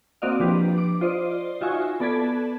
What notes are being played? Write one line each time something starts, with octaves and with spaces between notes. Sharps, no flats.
A#3 C4 F#4 D5 D#5 F5
F3 D4 G4 B4
D6
F4 C5 D5 D#5
D#4 F4 F#4 E5 G#5 C#6
B3 A4 D5 A5 B5 G#6